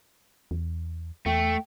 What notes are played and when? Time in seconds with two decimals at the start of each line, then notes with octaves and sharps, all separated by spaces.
0.51 E2
1.26 E2 A3 G5